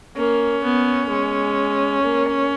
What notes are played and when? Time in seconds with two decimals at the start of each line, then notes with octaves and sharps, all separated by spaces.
0.17 A#3 C#4
0.63 B3
1.10 G#3
2.02 A#3